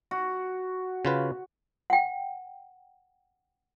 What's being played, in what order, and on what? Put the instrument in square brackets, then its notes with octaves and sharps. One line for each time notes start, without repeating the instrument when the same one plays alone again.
[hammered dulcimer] F#4
[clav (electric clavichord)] C#3 F4 B4
[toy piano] F#5 G5